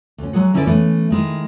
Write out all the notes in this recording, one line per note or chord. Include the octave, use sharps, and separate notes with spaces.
D2 C#4
F#3 G#3 G#4 F#5
D3 C#4 E4 G#4 B4 D5
E3 A3 B3 C#4
D#3 G#3 E4